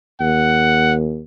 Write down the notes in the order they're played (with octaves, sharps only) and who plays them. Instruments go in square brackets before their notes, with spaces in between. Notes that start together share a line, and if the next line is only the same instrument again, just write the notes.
[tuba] D#2 [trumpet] F#5